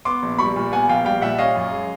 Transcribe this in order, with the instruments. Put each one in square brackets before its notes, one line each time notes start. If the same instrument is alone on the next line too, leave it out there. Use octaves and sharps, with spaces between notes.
[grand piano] B3 C6 D6
A#1
G3 B5 C#6
A#2
B3 F#5 G#5
A#1 F5 G5
G3 F5 G5
A#2 E5 F#5
C#4 D#5 F5
F#2
G#3